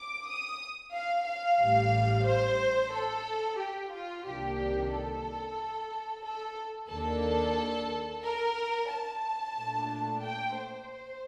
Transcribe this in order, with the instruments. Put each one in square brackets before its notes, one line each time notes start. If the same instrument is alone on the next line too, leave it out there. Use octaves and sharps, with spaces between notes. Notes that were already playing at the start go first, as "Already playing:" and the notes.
Already playing: [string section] D6
D#6
F5
F5
A1 A2 G3
C5
A4
G4
F4
C2 C3 D#3 A#3 D4 G4
A4
A4
D#2 D#3 A#3 D4 A4
A#4
A5
A#2 A3 D4
G5
C5